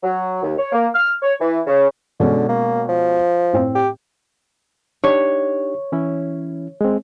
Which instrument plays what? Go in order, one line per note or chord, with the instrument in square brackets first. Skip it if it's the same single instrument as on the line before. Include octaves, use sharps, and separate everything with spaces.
[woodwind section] F#3
D#2
C#5
A#3
F6
C#5
E3
C#3
[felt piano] B2 G#3 C#4 [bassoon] D3
[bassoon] A#3
F3
[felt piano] A2 C4
[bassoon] G4
[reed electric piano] D4 D#4 G4 [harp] C#5
[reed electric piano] E3 C#4 E4
G#3 C4